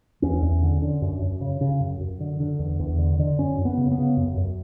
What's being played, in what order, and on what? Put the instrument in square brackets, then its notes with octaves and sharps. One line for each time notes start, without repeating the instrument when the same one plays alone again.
[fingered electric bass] E2 C#4
E2
D3
D3
F#2
F#2
C#3
C#3
F#2
F#2
D3
D3
E2
E2
D3
D3
F#2 C#4
F#2
B3
C#3
B3
C#3
F#2
F#2